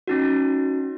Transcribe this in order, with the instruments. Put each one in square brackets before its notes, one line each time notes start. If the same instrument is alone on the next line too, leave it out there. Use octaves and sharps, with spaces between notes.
[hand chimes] C#4 D#4 F#4